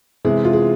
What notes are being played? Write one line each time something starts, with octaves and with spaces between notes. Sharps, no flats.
C3 E3 G#3 G#4
F4
G#4